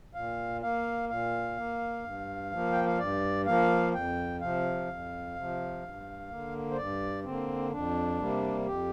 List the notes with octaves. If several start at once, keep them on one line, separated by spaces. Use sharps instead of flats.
A#2 F5
A#3 F5
A#2 F5
A#3
G2
F3 A#3
G5
F5
G2 D5
F3 A#3 F5
F2 G5
C3 F3 F5
F2
C3 F3
G2
D3 A#3
C5
G2 D5
D3 A#3 C4
F2 D4
C3 G3 A#3
F2 G4